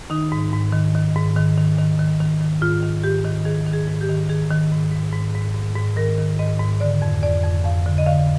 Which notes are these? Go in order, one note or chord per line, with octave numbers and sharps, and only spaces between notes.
D#3 D#4
G#2
G#2
D#3
D#3
G#2
D#3
D#3
D#3
D#3
D#3
D#3
G#2 F4
D#3
G#2 G4
D#3
D#3 G#4
D#3
G#4
G#2
G4
D#3
D#3 G#4
D#3
G#2
G#2
G#2
G#2
G#2
G#2
D#3 A#4
D#3
G#2 D#5
G#2
D3 D5
F2
F2 D5
F2
F2 F5
D3
D#5
D3 F5